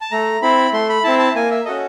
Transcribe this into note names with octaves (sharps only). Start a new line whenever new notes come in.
A5
A3 A#5
C4 E4 B5
A3 C6
B5
C4 E4 A5
A5
A#3 G#5
E5
C#4 F#4 A4 D#5